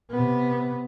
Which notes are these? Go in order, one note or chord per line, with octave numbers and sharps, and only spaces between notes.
C3 B3